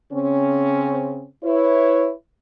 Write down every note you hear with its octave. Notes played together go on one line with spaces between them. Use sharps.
C#3 C4 C#4
E4 B4 C#5